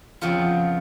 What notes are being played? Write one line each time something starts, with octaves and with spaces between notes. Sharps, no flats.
F2 C#3 F3 B3 F4